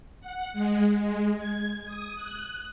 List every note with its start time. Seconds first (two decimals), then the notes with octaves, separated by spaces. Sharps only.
0.21 F#5
0.53 G#3
0.99 G#3
1.34 G#6
1.85 D#6
2.15 F#6